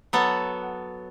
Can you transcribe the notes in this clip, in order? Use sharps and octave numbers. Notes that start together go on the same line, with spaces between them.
F#3 B3 A4 F#5